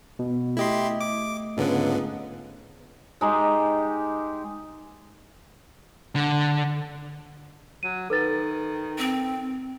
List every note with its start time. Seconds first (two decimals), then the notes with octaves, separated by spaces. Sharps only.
0.19 B2
0.57 A3 E4 G4 D#5 C6
1.01 D6
1.57 C#2 G#2 D3 B3
3.21 G#3 D#4 G4
6.16 D3
7.83 F#3 D#7
8.10 D#3 A4 B4 A6
8.98 C4